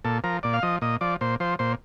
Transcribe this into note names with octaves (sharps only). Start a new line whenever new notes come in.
A#2 A4
F3 A#4
A#2 D5
F5
F3 D#5
A#2 D#5
F3 D5
A#2 C5
F3 C5
A#2 C5